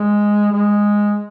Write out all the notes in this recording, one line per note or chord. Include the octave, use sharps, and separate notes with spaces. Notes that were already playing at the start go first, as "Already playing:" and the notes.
Already playing: G#3
G#3